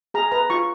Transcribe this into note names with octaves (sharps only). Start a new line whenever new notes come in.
G#4 A#5
B4 A#5
F4 C#6